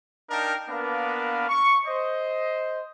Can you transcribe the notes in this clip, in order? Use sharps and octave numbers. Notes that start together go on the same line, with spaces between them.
D4 D#4 A#4 F5 G5 A5
A#3 B3 D4 A#4 B4 F5
C#6
C5 D#5